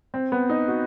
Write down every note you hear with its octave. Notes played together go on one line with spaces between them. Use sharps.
C4
B3
D#4
F#4